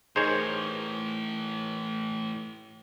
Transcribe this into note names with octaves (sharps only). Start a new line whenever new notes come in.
A2 E3 D#4 G#4 A#4 C5 C#5